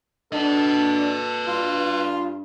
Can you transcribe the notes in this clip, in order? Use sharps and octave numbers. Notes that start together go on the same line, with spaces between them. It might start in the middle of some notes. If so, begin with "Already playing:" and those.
D4 A4 B4 D#5
G2 F4